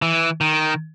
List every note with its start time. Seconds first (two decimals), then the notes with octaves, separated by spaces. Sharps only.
0.02 E3
0.41 D#3